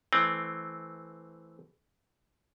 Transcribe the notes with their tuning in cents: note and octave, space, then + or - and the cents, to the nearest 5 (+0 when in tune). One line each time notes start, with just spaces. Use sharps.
E3 +0 A3 -15 C4 +0